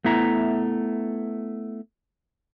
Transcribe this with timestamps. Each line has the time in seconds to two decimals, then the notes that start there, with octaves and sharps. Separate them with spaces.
0.05 A3 B3 E4 E5 A#5